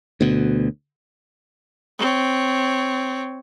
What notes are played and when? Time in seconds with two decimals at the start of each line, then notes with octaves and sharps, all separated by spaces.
0.21 D2 B2
1.99 C4 C#5